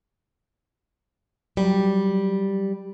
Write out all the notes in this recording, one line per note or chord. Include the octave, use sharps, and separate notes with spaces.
F#3 G3